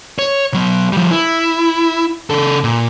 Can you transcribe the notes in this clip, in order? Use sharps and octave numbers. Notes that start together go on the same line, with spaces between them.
C#5
F#3 B3
F3 G3
E4
C#3 A4
A#2